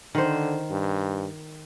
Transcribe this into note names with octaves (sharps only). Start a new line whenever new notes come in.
D3 D#3 C5
G2